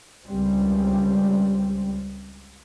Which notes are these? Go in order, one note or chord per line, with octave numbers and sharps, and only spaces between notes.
C#2 G3 C4